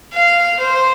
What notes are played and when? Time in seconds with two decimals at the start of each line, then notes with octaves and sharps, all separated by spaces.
0.13 F5
0.60 C5